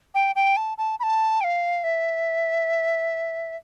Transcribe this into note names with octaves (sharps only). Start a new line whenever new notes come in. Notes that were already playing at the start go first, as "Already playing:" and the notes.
G5
G5
A5
A5
B5
A5
G5
F5
E5